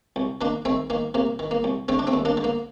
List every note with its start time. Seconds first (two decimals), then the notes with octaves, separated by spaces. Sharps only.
0.16 C2
0.41 D#3 A#3 D4
0.65 D#3 A3 C4
0.90 D#3 A#3
1.14 C3 A#3
1.39 D#3
1.51 A#3
1.64 C2
1.88 D3 A3 C4
1.99 D4
2.07 A3 C4
2.13 D#2
2.25 A#3 D4
2.37 D3
2.44 A#3